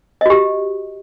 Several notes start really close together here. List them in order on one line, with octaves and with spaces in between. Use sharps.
D#5 F#4 G4